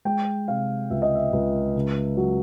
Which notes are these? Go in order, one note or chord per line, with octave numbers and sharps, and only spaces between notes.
G#3 G5
C3 F5
C#2 E5
D#5
E5
C#2
C#3
F#3